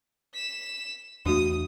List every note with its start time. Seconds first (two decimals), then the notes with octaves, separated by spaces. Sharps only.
0.34 B6 E7
1.26 E2 A3 D4 F#4 D#6